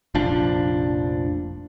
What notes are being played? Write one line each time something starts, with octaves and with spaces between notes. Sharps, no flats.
F1 A#1 F3 D4